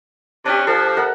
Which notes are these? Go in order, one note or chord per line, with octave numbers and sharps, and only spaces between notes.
C3 C#4 D4 G4
F3 A4
A#4 E5 F#5